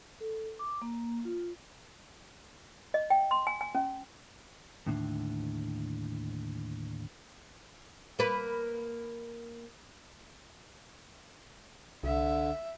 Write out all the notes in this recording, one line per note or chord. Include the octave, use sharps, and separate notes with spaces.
A4
D6
A#3
F4
D#5
G5
C6
G#5
G#5
C#4
D#2 A2 D3
A#3 B4
C2 D3 E5